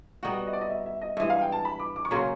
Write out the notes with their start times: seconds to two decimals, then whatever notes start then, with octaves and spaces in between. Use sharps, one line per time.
0.23 G3 B3 D#4 F#4 F#5
0.47 D#5
0.53 D5
0.61 D#5
0.70 E5
0.86 E5
1.02 D#5
1.17 G2 E3 G#3 E5
1.30 F5
1.41 G5
1.52 A5
1.65 B5
1.79 D6
1.96 D6
2.05 C#6
2.11 C#3 F#3 A#3 C#4 C6